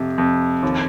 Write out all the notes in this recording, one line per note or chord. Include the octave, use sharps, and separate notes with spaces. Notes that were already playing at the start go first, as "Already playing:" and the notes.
Already playing: F2 C3
F2
D#2